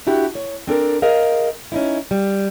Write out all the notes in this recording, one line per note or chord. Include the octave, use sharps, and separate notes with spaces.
D4 E4 F#4 G4
C#5
C4 D4 A4 A#4
G#4 A#4 D#5 F5
C#4 D#4 E4
G3